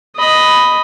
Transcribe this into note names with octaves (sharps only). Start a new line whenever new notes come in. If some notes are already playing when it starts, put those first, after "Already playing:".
D#5 B5